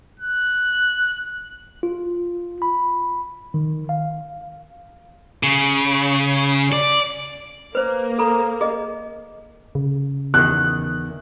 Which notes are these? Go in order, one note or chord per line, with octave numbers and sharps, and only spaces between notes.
F#6
F4
B5
D#3
F5
C#3
D5
A#3 B4 C5
A4 A#5
G#4 D#5
C#3
E2 D#3 F#6